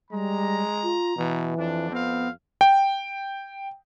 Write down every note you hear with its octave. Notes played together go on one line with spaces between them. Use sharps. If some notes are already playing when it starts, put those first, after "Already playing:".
G3 G#3 A#5
F4
B2 E3
F2 D4
B3 C4 F5
G5